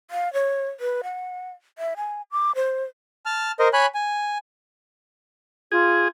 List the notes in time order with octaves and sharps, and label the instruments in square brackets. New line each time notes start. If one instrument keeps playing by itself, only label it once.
[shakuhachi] F5
C#5
B4
F#5
E5
G#5
D6
C5
[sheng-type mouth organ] A5 F6
A#4 C5 D#5
C#5 G#5 B5 F#6
G#5
[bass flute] F4 [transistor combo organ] G#4